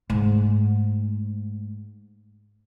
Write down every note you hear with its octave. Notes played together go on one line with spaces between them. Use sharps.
G#2 A3